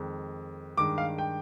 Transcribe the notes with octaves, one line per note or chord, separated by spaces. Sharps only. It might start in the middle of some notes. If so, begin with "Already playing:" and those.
Already playing: F2 D#3 G#3
G2 D#3 G#3 D6
F5
G5